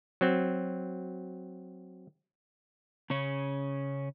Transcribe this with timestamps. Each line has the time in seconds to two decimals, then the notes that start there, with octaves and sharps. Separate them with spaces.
0.21 F#3 C4
3.10 C#3 C#4